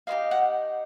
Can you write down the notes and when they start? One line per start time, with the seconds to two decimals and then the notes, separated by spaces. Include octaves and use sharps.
0.07 D#4 G4 C5 D#5 F5
0.31 F#5